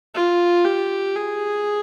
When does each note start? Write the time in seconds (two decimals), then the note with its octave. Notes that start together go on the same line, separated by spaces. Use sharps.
0.14 F4
0.65 G4
1.15 G#4